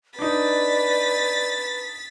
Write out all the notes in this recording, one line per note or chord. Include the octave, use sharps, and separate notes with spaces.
D4 D#4 B4 D5 A6 B6